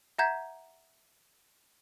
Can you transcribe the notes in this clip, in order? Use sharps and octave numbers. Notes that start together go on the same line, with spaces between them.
E5 F#5 A#5 G6 G#6 B6